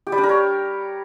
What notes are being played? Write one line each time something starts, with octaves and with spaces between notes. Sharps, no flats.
G4
G3
D4
A#4
C#5